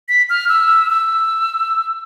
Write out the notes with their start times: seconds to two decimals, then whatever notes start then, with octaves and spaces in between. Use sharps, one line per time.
0.09 B6
0.30 F6
0.49 E6
0.90 E6